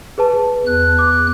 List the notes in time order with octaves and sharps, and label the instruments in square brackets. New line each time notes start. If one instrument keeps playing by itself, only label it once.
[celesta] G#4 B4 A5
[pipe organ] E2 F#6
[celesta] D6